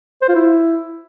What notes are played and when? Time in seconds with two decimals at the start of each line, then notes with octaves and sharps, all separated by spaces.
0.22 C5
0.29 F4
0.35 E4